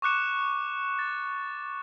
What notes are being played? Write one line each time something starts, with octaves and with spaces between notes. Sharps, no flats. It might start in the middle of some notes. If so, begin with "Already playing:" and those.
C#6 D6 F#6 C#7 E7
A6